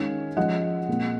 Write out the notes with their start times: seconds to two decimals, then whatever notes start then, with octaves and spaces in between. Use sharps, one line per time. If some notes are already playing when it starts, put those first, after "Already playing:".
Already playing: D#3 G#3 C#4 F5 G#5
0.37 F3 G#3 C#4 D#5 F#5
0.88 A#2 G#3 C4